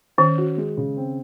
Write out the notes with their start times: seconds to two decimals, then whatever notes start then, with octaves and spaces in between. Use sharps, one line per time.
0.18 D#3 C#4
0.38 F#4
0.57 G#3
0.77 C#3
0.97 C4